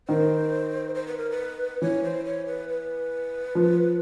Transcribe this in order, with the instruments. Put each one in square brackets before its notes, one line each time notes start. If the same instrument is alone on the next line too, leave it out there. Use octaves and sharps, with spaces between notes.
[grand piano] D#3 [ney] C5
[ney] C5
B4
A#4
B4
[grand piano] E3 [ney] C#5
[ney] C5
C#5
B4
B4
[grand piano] F3